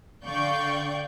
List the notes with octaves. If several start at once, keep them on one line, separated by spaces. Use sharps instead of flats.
D3 D5 F5 G5 C#6 G6